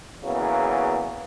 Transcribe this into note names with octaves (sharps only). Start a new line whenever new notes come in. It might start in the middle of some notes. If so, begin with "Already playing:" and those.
E2 C#3 F#3 A#3